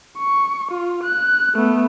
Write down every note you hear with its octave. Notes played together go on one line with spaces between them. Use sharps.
C#6
F4
F#6
A3 B3